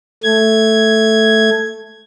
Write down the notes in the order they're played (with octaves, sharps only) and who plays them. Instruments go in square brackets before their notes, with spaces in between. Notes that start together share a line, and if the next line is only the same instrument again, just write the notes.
[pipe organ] A3 G#6